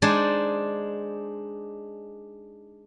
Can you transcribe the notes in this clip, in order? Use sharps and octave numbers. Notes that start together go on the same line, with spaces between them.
G#3 D4 D#4 C5 D5 G#5